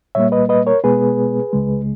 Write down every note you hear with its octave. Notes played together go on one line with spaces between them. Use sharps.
A#2 G3 A#3 C#5 E5
B4 D#5
B4 D#5
A#4 C#5
B2 G#3 B3 G#4 B4
C#2 C#3 G#3